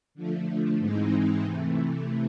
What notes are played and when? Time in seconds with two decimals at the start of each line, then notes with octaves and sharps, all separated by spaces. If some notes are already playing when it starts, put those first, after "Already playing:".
0.15 D3 F3 A3
0.79 G#2 E3 G#3 C4 D#4
1.43 C3 E3 A3